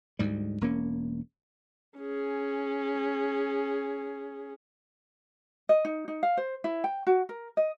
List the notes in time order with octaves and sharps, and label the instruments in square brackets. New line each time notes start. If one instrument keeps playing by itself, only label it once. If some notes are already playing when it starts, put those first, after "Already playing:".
[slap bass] D2 G#2 G3
E1 A#3 C#4
[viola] C#4 G#4
[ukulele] D#5
D#4
D#4
F5
C5
E4
G5
F#4
A#4
D#5